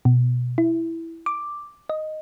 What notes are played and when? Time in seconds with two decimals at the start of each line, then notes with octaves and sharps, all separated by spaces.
0.05 B2
0.58 E4
1.26 D6
1.90 D#5